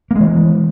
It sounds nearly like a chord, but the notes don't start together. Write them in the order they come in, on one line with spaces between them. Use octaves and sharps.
A#3 G#3 E3